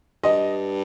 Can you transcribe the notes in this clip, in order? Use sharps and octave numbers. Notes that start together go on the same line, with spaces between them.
G2 D#5